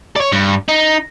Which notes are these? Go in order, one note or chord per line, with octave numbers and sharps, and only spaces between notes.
C#5 D5
G2
D#4